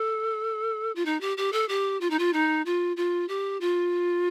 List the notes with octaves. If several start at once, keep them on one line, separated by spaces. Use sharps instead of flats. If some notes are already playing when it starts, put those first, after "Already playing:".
Already playing: A4
F4
D#4
G4
G4
A4
G4
F4
D#4
F4
D#4
F4
F4
G4
F4